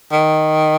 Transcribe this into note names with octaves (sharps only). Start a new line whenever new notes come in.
D#3